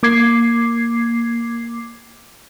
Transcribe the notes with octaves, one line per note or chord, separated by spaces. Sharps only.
A#3 D6 G#6 C7